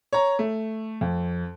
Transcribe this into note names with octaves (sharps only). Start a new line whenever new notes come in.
C#5 A#5
A3
F2